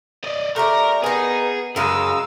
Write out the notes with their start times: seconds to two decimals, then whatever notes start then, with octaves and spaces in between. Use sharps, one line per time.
0.24 D5 D#5
0.56 A3 G4 A#4 D5 A#5
1.04 B3 D#4 G#4 A#4
1.76 F#2 C#3 G#3 A#4 F5 E6